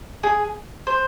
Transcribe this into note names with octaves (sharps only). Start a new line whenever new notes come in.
G#4
C5